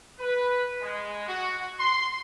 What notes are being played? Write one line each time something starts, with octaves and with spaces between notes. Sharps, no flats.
B4
G#3
F#4
C6